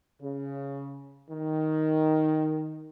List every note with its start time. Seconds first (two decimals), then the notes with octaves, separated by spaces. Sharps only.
0.22 C#3
1.30 D#3